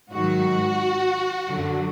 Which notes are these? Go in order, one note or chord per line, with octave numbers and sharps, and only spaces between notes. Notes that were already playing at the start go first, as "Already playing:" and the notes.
G#2 D#3 F#3 F#4
F#2 D3 F#3